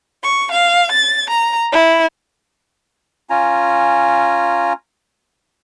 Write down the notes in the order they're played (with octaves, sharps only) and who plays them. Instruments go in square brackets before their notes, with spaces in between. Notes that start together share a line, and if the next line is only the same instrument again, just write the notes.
[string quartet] C#6
F5
A6
A#5
E4
[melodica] C#4 F4 G#5 A#5